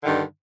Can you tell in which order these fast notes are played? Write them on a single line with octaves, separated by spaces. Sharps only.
D3 D#3 G2